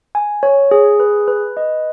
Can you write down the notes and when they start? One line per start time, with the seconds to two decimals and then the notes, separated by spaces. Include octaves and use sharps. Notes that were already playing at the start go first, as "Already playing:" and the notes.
0.15 G#5
0.43 C#5
0.71 G#4
1.00 B4
1.28 B4
1.57 D#5